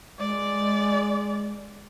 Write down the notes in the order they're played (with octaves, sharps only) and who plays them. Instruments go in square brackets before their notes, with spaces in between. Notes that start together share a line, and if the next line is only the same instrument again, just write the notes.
[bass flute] G#3 [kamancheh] D5